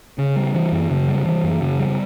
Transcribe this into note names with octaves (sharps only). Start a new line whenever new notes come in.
C#3
G3
E3
F#2
C#3
G3
E3
F#2
C#3
G3